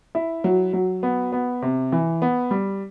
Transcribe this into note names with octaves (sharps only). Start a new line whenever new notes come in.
E4
F#3
F#3
B3
B3
C3
E3
B3
G3